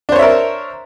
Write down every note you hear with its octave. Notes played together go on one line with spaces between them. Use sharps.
D4 A#4 C5 C#5 E5